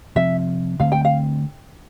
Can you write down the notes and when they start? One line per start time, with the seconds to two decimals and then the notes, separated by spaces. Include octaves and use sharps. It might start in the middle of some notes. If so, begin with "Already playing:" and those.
0.15 C3 F3 C4 E5
0.80 D3 A3 C4 F5
0.92 G5
1.05 F5